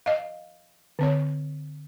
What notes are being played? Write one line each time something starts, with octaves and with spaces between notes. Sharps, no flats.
D#5 F5
D3 C4 C#5